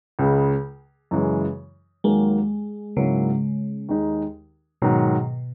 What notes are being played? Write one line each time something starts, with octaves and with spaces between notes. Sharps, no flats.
C#2 C#3 G#3
F#2 C#3 E3 G#3
D#2 D#3 F#3 G#3 A#3
G#2 C#3 F#3 A#3 C#4 E4
D#2 D#3 G#3 D#4
G#2 B2 D#3 F#3